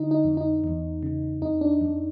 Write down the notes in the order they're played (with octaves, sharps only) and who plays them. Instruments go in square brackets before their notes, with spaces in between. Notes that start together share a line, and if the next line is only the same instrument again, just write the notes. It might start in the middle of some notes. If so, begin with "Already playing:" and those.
Already playing: [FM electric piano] D3 D#4
D#4
F2
D#4
E2
C#3
F2 D#4
D4
F2